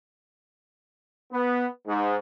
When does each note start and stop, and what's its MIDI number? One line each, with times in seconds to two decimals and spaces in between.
1.32 1.66 59
1.86 2.16 44